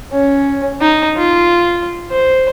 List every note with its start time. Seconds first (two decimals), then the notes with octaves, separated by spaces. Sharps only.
0.12 C#4
0.81 D#4
1.17 F4
2.12 C5